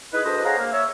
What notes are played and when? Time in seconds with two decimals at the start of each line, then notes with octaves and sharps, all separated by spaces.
0.12 D#4 E4 G#4 B4
0.24 D2 D4 G#4 B4 C5 D#5
0.44 G#4 C5 C#5 F5 F#5 A#5
0.58 A#3
0.72 C#5 E5